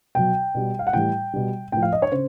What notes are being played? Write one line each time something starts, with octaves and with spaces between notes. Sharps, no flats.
B2 F#3 G5
B2 G3
F5
F#5
A2 E3 G3 G5
B2 G3
A2 F3 G5
F5
D#5
C#5
C#3 C5